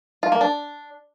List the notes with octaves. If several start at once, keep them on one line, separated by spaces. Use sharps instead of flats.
F4
A#3
D4